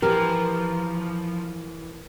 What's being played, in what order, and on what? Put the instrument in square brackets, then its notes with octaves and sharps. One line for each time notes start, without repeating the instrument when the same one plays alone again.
[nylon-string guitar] E3 G4 [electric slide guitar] F3 [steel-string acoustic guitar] A#4